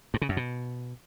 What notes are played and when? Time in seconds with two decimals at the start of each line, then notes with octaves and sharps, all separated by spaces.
0.14 G2
0.21 C#3
0.29 F#2
0.37 B2